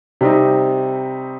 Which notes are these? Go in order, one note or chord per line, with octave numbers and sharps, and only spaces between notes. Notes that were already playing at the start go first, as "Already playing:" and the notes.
C3 G3 C4 D#4